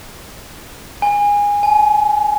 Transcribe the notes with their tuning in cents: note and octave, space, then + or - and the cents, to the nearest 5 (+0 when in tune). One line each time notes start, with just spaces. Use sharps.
G#5 -20
G#5 +35